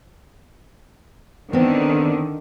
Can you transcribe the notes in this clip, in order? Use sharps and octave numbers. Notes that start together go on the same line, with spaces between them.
D3 D#3 B3 C4